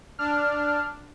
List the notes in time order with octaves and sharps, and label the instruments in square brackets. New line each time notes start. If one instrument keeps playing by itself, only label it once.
[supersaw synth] D4 [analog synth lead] F6